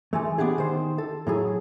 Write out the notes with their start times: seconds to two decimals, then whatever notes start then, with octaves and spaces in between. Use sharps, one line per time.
0.13 E3 G#3 A3
0.38 B3 D4 G4 G#4
0.58 D#3 C5
0.98 A4
1.27 A2 F#3 G#4